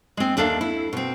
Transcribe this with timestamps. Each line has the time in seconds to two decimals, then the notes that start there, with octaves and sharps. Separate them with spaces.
0.17 G#3 C4
0.37 D#2 D4 A4 E5 F5
0.61 E4
0.93 B2 C4